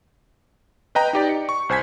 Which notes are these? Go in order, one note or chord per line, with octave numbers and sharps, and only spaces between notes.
B4 D#5 G5 A#5
D#4 G4 D5
C#7
C#6
C2 C5 G#5 G#6 B6